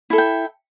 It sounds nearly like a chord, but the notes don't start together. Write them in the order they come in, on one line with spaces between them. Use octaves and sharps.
E4 A4 E5 G5